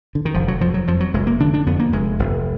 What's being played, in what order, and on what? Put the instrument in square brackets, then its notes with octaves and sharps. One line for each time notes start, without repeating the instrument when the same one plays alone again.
[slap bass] D3
D#3
F1 F3
F#3
F2 F3
F#3
F2 F3
F#3
F1 G#3
A#3
D3 D4
D4
F2 B3
A#3
F1 G#3
F1